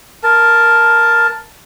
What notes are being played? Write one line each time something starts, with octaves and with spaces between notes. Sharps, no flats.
A#4 A5